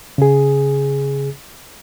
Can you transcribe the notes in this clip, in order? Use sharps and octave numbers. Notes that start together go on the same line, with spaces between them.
C#3 G#4